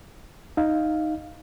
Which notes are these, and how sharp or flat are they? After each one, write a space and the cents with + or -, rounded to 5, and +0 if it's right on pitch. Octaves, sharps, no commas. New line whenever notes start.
D#4 +0 F5 +0